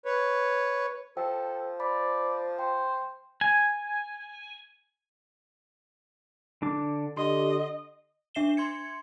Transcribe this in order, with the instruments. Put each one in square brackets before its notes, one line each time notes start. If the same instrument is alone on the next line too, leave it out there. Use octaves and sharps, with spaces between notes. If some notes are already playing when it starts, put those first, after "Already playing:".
[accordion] B4 C#5
[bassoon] F3 [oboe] A4 [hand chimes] G5
[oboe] D5 [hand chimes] B5
[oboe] C5 [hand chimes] G5
[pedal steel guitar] G#5
D3 D4 D6
[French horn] D3 [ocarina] G4 [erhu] D#5 [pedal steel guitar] C6
[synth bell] D4 E5 C7 E7 G7
C6 G#6 C#7